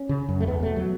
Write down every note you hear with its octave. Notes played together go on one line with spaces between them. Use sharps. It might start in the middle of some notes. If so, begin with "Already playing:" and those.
Already playing: C#4
C#3
F#2
A3
E2 B3
B2 A3
F#3